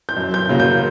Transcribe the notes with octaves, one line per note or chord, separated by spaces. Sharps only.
G6
F#2
G6
C#3 F#3 A#3
G6